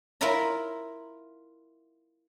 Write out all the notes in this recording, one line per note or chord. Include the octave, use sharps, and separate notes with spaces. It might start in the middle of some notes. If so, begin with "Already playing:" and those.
E4 F4 A#4 E5 A#5 B5